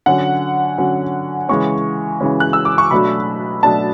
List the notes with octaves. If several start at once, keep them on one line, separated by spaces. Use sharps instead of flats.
D3 F#3 C#4 F#5
D3 F#3 C#4
C#3 E3 G#3 C#4 C#6
C#3 E3 G#3 C#4
F#6
E6
D6
C#6
B2 F#3 A3 D4 B5
B2 F#3 A3 D4 A5